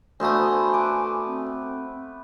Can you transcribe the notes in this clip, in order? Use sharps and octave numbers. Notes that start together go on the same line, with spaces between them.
D2 A3 B3 C5 G#5 D#6
B4 D6
C4